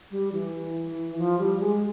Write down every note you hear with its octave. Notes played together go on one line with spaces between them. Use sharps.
G3
E3
F3
G3
G#3